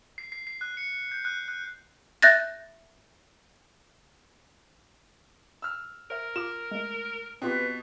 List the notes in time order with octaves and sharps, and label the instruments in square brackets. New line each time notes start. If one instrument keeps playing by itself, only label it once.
[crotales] C7
C7
C7
F#6
C#7
G6
F#6
F#6
[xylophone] E5 F#6 G6 A6 A#6
[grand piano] E6 F6
[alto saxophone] A#4 [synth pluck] C5 E5
[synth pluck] F4 D6 [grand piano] E7
[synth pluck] G#3 A3
[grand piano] B2 [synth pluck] C4 F4 G4 [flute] B4